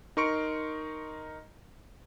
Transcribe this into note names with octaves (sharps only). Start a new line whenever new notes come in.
D#4 A#4 C6 C#6 C#7 D7